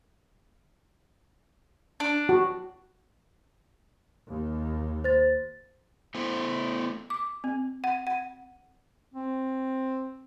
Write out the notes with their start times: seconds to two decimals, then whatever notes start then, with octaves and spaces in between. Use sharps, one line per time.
2.00 D4
2.29 F#4
4.29 D#2
5.04 C5 A6
6.15 A3 B3 E4 C5
7.10 D6
7.44 C4
7.84 F#5
8.07 F#5
9.14 C4